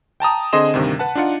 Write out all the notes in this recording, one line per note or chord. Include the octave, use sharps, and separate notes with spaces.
G5 A5 A#5 D#6
D3 C4 G#4 D#5 C6 E7
D2 G2 C3 D#3
B4 F#5 A5
D4 D#4 F4 F#5 C#7